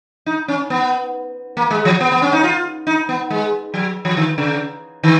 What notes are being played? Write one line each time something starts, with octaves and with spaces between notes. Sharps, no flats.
D#4
C#4
B3
A#3
G#3
F3
B3
B3
C#4
D#4
F4
D#4
B3
G#3
F#3
F3
D#3
C#3
D#3